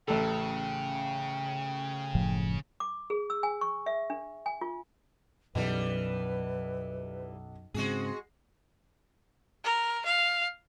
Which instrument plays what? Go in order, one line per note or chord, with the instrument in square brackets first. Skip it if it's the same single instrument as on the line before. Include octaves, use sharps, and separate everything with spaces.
[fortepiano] A1 A4 [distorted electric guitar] C#3 [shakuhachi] G5
[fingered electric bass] F#1 A2 F3
[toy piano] D6
G#4
E6
G#5
C#6
E5
D4
G#5
F4
[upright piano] B1 [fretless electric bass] F#2 [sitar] E3 G3 [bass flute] B4
[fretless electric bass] G#2 C#3 [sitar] G#3 F#4 G#4 [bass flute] C4
[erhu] A#4
F5